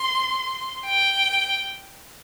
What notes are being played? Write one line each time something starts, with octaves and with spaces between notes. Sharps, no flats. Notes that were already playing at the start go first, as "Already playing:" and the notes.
Already playing: C6
G5